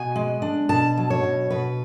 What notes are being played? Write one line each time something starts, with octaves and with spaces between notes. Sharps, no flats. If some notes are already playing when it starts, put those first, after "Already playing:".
Already playing: B2 G#5
G#3
D4
B2 A5
F#3
C#5
B2
B2 B4